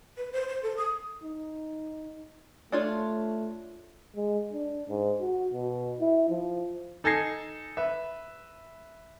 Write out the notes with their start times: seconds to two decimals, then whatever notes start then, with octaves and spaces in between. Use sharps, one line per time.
0.18 B4
0.33 C5
0.48 C5
0.63 A4
0.77 D#6
1.23 D#4
2.72 A3 D4 F4 C#5
4.16 G#3
4.53 D4
4.89 G#2
5.20 F#4
5.54 B2
6.00 E4
6.29 F3
7.04 D#4 A4 G#5 G#6 A#6 C7
7.77 B4 E5